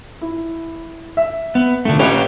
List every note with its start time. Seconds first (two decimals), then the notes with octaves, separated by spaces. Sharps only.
0.21 E4
1.17 E5
1.55 B3
1.85 A#2 D3 F3 A3
1.99 C#4 G4 B4 C#5 D#5